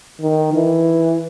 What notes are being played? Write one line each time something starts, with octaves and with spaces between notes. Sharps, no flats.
D#3
E3